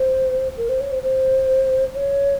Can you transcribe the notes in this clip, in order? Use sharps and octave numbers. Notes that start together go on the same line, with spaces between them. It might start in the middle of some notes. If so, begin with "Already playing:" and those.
Already playing: C5
A#4
C5
C#5
C5
C5
C#5